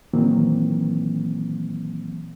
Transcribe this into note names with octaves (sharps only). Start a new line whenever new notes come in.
A#2 D#3 E3 F#3 A#3 C4